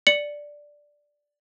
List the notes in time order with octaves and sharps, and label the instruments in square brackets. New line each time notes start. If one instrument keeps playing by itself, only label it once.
[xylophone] D5 C#7 F#7